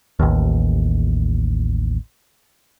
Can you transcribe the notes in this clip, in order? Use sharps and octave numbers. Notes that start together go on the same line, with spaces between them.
A1 D#2